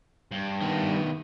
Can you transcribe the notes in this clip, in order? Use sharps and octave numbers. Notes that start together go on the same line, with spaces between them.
G2
D#3 B3